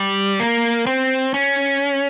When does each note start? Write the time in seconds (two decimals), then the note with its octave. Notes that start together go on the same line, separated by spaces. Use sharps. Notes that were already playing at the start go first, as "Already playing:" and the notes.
Already playing: G3
0.40 A#3
0.86 C4
1.34 C#4